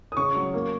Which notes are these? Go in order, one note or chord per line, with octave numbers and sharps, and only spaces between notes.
D#6
C#3 C#6
F#3
A#3